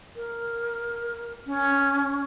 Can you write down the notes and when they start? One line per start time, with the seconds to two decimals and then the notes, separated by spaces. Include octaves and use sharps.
0.16 A#4
1.47 C#4